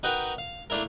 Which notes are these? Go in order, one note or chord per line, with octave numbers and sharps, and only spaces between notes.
D#4 F#4 A#4 B4 G5
F5
A3 A#3 D4 E4 A#4